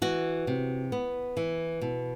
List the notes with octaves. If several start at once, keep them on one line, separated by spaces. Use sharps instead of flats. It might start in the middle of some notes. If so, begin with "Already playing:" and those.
E3 F#4
C3
B3
E3
B2